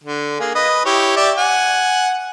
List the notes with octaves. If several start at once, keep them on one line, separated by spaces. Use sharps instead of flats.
D3
A#3 G#4
B4 D#5
E4 G4 C#5
G4 D5 E5
F#5 G#5